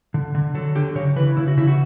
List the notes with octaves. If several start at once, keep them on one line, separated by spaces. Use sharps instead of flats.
D3
D3
F#3 A4
D3 G4
C#3 C#5
E3 B4
C#3 E4
F#4
C#3 E4
F#4